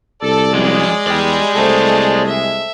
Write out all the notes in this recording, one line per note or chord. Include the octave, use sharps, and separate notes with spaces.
C2 A4 D5
F2 F#3 G#3
E2 D5 G5
C2 A3 C5
E5